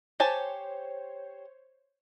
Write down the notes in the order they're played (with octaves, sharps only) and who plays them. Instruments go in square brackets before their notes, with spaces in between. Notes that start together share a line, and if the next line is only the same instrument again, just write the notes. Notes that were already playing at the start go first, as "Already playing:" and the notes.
[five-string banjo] G4 G#5 A5 [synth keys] C5 C#5